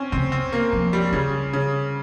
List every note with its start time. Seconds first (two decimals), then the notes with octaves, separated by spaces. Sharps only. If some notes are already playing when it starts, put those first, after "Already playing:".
Already playing: C4 C#4
0.12 C#3 C4
0.32 C4
0.52 A#3
0.73 F3
0.93 G3
1.12 C#3 G3
1.53 C#3